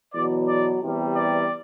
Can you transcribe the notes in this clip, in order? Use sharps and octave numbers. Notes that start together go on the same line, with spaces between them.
E2 B2 F#3 D5
D5
E2 C3 G3
D5